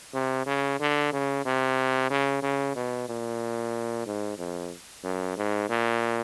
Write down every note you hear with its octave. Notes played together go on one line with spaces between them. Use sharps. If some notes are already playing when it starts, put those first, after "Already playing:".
C3
C#3
D3
C#3
C3
C#3
C#3
B2
A#2
G#2
F2
F#2
G#2
A#2